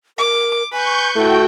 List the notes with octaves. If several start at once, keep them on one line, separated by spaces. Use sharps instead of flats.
A#4 D6
B4 G#5 C#6 G6
A3 E4 F#4 G5